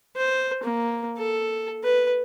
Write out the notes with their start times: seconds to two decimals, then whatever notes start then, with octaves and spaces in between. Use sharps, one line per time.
0.16 C5
0.64 A#3
1.18 A4
1.84 B4